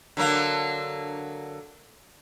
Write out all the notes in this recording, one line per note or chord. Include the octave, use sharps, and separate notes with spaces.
D3 F#3 A#3